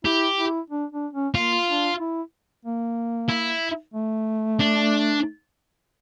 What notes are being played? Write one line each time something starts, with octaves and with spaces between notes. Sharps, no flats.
E4 G4
E4
D4
D4
C#4
A#3 F4
D4
E4
A#3
E4
A3
D4